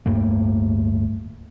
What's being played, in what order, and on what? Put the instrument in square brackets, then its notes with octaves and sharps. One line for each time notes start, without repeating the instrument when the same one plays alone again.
[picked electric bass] D1 G2 A3 A#3